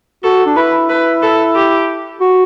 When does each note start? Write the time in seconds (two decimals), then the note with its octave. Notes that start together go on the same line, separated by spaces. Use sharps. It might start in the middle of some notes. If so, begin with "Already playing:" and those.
0.24 F#4 A4
0.46 D4
0.57 E4 B4
0.90 B4
1.23 A4
1.55 G4
2.21 F#4